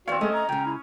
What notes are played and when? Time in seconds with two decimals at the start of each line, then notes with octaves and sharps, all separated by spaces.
0.08 E2 C4 F#4 C#5 D5 F5
0.21 G#3 A3 C#4 D#5 D#6
0.33 A#5
0.49 C#2 C#3 G5
0.66 E4